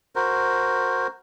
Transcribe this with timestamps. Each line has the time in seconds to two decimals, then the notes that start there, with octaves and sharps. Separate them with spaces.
0.16 F#4 A#4 C5